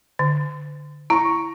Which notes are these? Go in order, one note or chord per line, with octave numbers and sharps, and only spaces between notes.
D3
E4 A#5 C#6